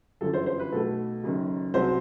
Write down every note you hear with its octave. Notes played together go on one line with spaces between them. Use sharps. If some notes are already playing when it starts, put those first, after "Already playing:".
G1 F#2 E3 A4
C5
C5
B4
B1 B2 A3 A4
F#1 F#2 D#3
C2 C3 F#3 C5